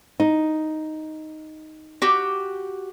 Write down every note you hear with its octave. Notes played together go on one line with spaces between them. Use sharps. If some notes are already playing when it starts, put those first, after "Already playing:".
D#4
F#4 G4